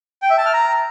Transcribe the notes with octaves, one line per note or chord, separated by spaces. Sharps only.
G5
E5
A5
F6
A#5